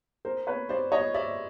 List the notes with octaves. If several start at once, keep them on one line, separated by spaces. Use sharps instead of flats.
A#4 C5
B4 C#5
C5 D5
C#5 D#5
D5 E5